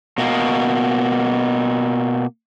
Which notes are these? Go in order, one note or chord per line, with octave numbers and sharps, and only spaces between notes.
B2 A#3